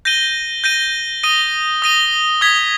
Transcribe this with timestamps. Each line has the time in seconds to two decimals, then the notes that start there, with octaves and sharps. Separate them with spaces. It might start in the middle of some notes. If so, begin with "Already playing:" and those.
0.05 G6 A#6 D#7 G7
0.64 G6 A#6 D#7 G7
1.23 D#6 A#6 D#7 G7
1.82 D#6 A#6 D#7 G7
2.41 D#6 G#6 B6 G7